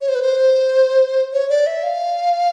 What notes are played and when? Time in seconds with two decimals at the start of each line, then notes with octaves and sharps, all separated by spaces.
0.01 C#5
0.08 C5
0.15 B4
0.22 C5
1.33 C#5
1.50 D5
1.66 E5
1.83 F5